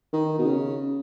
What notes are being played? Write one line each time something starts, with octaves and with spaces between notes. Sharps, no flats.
D#3
B2
C#3